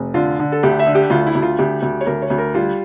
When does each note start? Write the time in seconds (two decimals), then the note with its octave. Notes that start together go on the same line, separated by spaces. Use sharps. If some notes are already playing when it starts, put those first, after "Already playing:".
Already playing: F1
0.14 D3 F4
0.39 D3
0.52 A4
0.63 D2 G4
0.79 E5
0.86 D3
0.95 G4
1.10 D2 F4
1.26 E4
1.35 D2
1.42 F4
1.58 D2 G4
1.82 D2
2.01 C#5
2.06 D2 A#4
2.22 C#5
2.30 D2
2.38 A#4
2.55 G3 F4